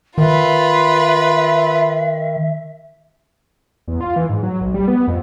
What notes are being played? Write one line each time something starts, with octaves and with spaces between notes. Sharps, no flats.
D#3 F4 B4 E5
E2
F4
E3
G#2
F#3
B1
G3
B3
F2